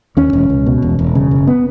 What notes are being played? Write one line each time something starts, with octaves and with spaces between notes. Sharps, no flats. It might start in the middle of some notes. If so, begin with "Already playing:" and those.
D#2 C#4
E1
C#2
B2
E1
E1
C#3
F#1
B3